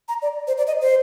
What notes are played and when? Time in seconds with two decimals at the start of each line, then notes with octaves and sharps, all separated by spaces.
0.09 A#5
0.22 D5
0.48 C5
0.58 D5
0.67 D#5
0.82 C5